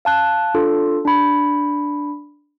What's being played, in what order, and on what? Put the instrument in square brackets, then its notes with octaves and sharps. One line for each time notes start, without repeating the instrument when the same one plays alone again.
[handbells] F5 A5 F#6
D4 F4 A4
D4 B5